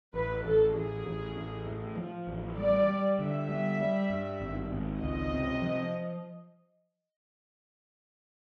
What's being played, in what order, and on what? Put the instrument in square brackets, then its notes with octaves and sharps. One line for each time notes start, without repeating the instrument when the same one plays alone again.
[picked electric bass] A1 [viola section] B4
[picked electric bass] A1 [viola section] A4
[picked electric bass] A1 [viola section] G#4
[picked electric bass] A1
A1
A2
F3
A1
[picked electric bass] G3 [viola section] D5
[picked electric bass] G3
[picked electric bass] D3 [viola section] E5
[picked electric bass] G3
G3
G2
G#1
G#1
[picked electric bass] C#2 [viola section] D#5
[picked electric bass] C3
F3